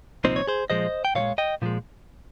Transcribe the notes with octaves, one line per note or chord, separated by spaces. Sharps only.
C2 A#2 F3 C4 D#4 C5
C#5
G#4 C5
A#2 F3 G#3 C5 D#5
G5
A#2 F3 C#5 F5
G#3
D#5 G5
A#2 F3 G#3